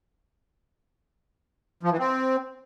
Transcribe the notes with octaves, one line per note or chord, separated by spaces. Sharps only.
F3
E3
C4